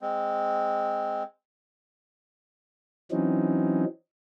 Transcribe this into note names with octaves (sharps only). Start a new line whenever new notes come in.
G#3 C4
E3 F#3 C4 C#4 D#4